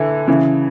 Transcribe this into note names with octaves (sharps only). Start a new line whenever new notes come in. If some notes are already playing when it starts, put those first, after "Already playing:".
Already playing: D3 E3
C#3 E3